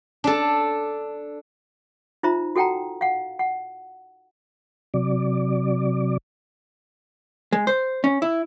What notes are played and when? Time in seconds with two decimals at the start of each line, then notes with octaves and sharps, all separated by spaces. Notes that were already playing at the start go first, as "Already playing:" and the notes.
0.24 D4 A4
2.23 D#4 F4 C5 E5 A#5
2.56 F#4 A4 F#5 G5 A5 A#5
3.01 F5 F#5
3.39 F#5
4.94 C3 F#3 D5
7.52 G#3
7.67 C5
8.04 C#4
8.22 E4